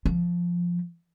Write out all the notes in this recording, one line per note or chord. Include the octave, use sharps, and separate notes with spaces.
F3